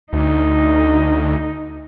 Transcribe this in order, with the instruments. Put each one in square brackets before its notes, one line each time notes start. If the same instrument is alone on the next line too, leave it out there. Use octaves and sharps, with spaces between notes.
[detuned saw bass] D2 [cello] D#4